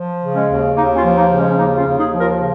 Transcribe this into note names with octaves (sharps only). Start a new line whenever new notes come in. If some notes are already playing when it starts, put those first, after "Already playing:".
Already playing: F3
C#3
G#3 C#4
D#2
D#2 A#3 D#4
C#4 F4
F3
A#3 D#4
C#3
G#3 C#4
C#4
D#2 A#3 D#4
C#4 F4
D#2
D#4 G#4
F3
F4 A#4
C#3